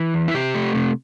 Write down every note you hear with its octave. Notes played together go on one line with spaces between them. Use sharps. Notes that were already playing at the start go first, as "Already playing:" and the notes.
Already playing: E3
E2
E4
C3 G4
A3
C3